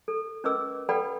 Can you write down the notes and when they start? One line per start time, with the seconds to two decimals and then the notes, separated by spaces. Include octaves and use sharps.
0.08 A4
0.44 C#4 A#4 B4 D#5 D6 E6
0.89 A4 B4 D5 F#5 G5 B5